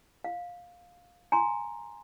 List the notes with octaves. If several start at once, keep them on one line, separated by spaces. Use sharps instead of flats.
F5
G#5 A#5 C6